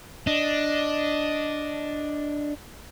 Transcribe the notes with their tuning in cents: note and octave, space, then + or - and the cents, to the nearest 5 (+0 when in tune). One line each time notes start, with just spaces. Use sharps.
D4 +0 D#5 +0